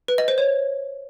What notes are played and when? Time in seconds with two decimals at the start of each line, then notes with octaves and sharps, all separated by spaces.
0.08 B4
0.18 D#5
0.28 C5
0.38 C#5